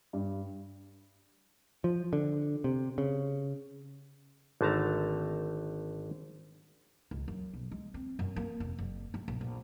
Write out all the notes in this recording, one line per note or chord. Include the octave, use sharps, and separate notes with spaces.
G2
F3
D3
C3
C#3
G#1 D3 A3 A5 A#5
C#2
F#2
B1
G#3
C4
F#2
A#3
F1
F#1
A3
A#1
A#1